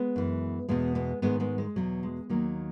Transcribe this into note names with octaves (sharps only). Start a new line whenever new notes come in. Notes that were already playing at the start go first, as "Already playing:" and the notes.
Already playing: G#3 B3
F#2 E3
E2 B2 G#3 B3
G#3 B3
G#2 D#3 G#3 B3
G#3 B3
G#3
E2 B2 F#3
G#3
D#2 D#3 F#3 A#3